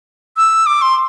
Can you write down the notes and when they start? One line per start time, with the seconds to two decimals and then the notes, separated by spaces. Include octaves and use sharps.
0.37 E6
0.66 D6
0.82 C6